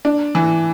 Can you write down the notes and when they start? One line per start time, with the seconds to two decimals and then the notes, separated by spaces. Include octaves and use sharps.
0.05 D4
0.35 E3